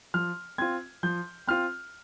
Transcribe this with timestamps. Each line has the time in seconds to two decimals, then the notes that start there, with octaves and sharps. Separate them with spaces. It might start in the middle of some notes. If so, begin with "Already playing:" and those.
0.14 F3 F6
0.58 C4 F4 G#6
1.03 F3 G6
1.47 C4 F4 F6